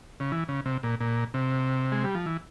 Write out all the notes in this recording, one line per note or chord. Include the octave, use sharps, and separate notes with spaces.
C#3
E3
C#3
C3
A#2
A#2
C3
G#3
G3
F3
E3